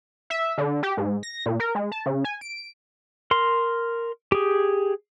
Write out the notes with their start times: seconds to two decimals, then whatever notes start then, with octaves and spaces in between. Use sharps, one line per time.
0.30 E5
0.58 D3
0.83 G4
0.97 G#2
1.23 A#6
1.46 A#2
1.60 A#4
1.75 G#3
1.92 A5
2.06 C#3
2.25 G#5
2.41 D7
3.31 A#4 C6
4.32 G4 G#4